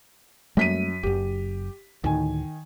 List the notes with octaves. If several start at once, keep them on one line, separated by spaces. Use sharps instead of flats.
F#2 G3 A3 A#3 B6 D#7
F#1 F#2 G4
D2 A2 D#3 G#5